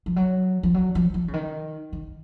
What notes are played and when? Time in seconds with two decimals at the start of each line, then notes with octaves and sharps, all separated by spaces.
0.06 F3
0.16 F#3
0.63 F3
0.74 F#3
0.95 F3
1.14 F3
1.28 C#3
1.33 D#3
1.93 D#3